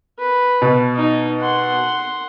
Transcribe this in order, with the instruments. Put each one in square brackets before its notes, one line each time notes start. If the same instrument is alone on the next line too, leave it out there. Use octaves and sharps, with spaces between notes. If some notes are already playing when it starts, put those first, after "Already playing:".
[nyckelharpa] B4
[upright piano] B2
[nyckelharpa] D#4
F#5 C6